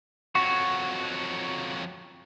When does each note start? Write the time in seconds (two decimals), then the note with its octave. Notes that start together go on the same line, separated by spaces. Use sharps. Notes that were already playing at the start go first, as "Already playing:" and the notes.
0.35 F2 F#3 F#4 C#6